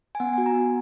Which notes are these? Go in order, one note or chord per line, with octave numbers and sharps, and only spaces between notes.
G#5
B3 F#5
G#5
F#4
A#5
B3